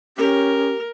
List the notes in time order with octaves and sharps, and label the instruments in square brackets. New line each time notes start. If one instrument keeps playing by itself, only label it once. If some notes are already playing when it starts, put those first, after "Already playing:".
[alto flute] C#4 [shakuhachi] G4 [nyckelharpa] A#4